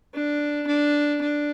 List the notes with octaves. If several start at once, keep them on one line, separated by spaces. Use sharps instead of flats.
D4
D4
D4